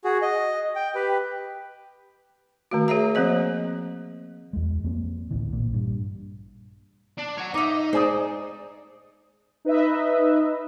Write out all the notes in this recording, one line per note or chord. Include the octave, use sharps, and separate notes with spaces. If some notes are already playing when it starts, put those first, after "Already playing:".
F#4 G#4
D#5
G5
G4 B4
D#3 A3 F#4
G#4 C#5 E5 A#5
F3 A#3 C4 C5 D#5
E2 G#3
F2 A#3 C4
A1 D2 E3
A#1 A#2
G2
D4
C#5 F#5
D#4 C#5 E5 D6
D#5
G#3 G#4 C5 D5 G#5 D#6
D#4 B4 D#5 E5